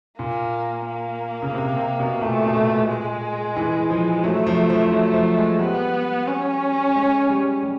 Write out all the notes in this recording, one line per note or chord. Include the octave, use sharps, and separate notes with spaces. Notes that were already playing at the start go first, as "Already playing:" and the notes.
A#2 A#3
A#3
C#3
C3
C3
B2
A#2 A3
B2
A#2
G#3
E3
F3
F#3 A3
F3
F3
F3
F#3
F3
G#3
G3 B3
C#4
G#3
G3
G3